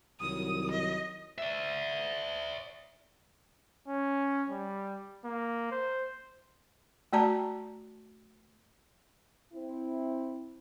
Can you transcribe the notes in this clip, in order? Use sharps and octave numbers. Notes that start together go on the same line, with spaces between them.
C2 D#3 F#3 D#6
D#5
D5 E5
C#4
G3
A#3
C5
A3 F#4 D5 A5 A#5
C4 E4